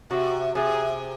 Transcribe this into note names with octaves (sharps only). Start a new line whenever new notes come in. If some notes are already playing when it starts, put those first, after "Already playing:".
C3 F#4
C3 G#4